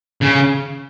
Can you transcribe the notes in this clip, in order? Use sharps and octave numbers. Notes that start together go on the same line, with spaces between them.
C#3